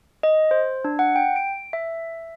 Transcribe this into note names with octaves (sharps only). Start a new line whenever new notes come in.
D#5
C5
D4
F#5
G5
D7
E5